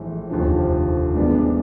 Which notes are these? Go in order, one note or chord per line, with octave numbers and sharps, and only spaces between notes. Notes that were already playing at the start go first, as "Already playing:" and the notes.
Already playing: A#1 A2 E3 G#3
F1 D#2 D3 F3
G2 E3 G#3 B3 D4